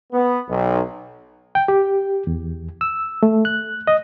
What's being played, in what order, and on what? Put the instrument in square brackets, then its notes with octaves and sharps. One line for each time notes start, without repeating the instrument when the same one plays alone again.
[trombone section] B3
B1
[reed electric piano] G5
G4
E2
E6
A3
F#6
D#5